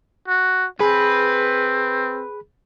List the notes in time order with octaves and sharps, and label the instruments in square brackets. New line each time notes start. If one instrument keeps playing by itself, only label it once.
[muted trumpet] F#4
[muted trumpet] C4 [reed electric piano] G#4 [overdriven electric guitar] B4